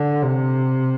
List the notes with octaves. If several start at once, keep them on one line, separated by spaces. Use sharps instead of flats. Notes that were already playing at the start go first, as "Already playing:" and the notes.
Already playing: D3
C3